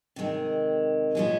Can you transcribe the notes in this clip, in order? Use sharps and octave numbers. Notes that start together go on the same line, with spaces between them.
C3 D#3 G#3
A#2 F3 G#3 C#4 G#4